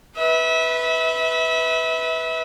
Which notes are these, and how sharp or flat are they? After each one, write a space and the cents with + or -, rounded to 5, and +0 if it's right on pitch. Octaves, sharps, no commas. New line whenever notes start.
B4 +0 E5 -30